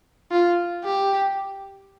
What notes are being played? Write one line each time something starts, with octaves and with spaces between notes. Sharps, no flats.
F4
G4